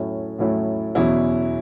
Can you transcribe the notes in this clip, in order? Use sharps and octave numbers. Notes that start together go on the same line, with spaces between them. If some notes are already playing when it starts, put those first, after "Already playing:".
Already playing: A2 F#3 A3 C#4 E4
A2 F#3 A3 C#4 E4
E2 B2 F#3 C#4 E4